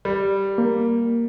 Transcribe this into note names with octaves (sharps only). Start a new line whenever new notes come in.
G3
A#3